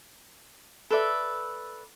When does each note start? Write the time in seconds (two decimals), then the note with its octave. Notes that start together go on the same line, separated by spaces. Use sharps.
0.90 A4 B4 D5 E5